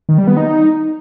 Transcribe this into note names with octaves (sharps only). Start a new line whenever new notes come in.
D#3
G3
B3
D#4